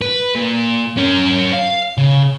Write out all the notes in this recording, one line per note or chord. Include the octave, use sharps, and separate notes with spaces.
B4
A#2
C#4 A#4
F5
C#3